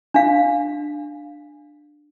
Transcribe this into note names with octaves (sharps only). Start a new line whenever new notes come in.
D4 F5